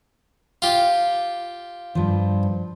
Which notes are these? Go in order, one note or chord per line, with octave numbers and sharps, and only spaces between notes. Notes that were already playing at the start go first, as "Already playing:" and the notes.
F4 G4
G2 F3